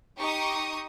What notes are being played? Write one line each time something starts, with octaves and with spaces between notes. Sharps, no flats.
D#4 G4 C#6 D#6